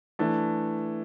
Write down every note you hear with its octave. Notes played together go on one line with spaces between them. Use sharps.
E3 A3 D4